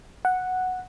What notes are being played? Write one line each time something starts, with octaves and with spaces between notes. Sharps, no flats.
F#5